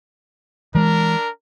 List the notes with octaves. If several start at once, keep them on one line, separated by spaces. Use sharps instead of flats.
E3 G#3 D4 A#4